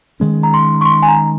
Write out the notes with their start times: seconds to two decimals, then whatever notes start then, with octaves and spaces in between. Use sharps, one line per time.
0.20 D#3 G#3 C#4
0.43 A#5
0.54 C6
0.81 C#6
0.85 C6
1.02 G#5
1.08 A#5